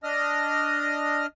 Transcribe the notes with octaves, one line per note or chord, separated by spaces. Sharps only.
D4 D#5 D#6 F6